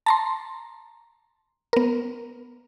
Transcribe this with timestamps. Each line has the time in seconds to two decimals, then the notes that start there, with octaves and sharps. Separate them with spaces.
0.06 A5 A#5 C6
1.73 B3 A#4